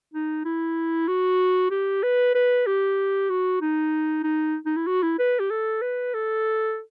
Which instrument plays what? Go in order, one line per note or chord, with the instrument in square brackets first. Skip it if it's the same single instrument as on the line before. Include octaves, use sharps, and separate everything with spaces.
[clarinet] D#4
E4
F#4
G4
B4
B4
G4
F#4
D#4
D#4
D#4
E4
F#4
E4
B4
G4
A4
B4
A4